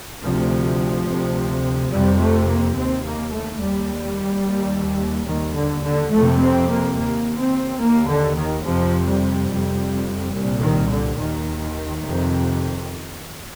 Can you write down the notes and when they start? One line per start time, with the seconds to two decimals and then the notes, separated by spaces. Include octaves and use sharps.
0.23 D2 C3 F3
1.08 D2 C3
1.91 F2 C3 G3
2.20 A3
2.48 A#3
2.76 D#2 C4
3.04 A#3
3.32 A3
3.59 D#2 G3
4.44 D#2
5.28 D#2 D#3
5.56 D3
5.84 D3
6.12 F2 C3 A3
6.40 C4
6.68 A#3
6.96 D#2 A#3
7.38 C4
7.80 D#2 A#3
8.08 D3
8.36 D#3
8.64 F2 C3 F3
9.06 G3
9.48 F2
9.53 C3
10.32 C2 A#2
10.60 D#3
10.89 D3
11.17 D#2 D#3
12.01 F2 C3